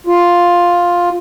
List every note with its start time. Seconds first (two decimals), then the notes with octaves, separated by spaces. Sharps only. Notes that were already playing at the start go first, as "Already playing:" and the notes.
0.07 F4